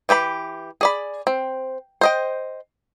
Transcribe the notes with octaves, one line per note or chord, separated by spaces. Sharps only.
E3 G4 G#4 B5
G#4 D5 B5
C4
C5 D#5 G5